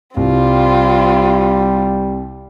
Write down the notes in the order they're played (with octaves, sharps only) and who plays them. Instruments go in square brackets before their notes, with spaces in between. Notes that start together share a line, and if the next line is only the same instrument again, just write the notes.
[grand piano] C2 [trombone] G3 [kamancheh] C4 F4